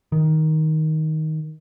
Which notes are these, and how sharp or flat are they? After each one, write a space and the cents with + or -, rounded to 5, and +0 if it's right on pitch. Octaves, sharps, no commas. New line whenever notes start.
D#3 +10